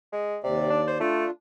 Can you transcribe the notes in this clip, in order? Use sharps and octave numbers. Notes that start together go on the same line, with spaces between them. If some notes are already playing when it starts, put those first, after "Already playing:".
G#3
D#2 C3 D5
D4
C5
A3 D4 F4